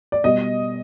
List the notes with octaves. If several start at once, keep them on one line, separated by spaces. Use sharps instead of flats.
D5
B2 G3 D#5